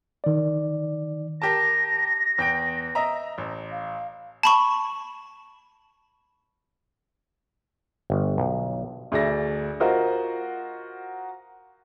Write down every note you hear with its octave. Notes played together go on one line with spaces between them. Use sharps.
D#3 D5
G4 A#4 A5 A#6
E2 G5 D7
D#5 E5 A#5
A1
F5
A5 B5 C#6
G1
B1
D2 G#4 D5 E5 A#6
F4 F#4 A#4 C5 D#5